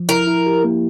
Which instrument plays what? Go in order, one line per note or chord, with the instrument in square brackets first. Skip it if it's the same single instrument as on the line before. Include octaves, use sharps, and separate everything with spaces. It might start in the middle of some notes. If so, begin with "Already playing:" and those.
Already playing: [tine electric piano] F3
[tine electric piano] E4 [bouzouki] A#4
[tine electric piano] E4
G4
A#3